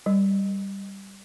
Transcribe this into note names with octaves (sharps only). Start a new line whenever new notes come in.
G3